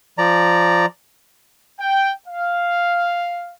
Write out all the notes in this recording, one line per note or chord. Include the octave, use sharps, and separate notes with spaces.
F3 D5 A#5
G5
F5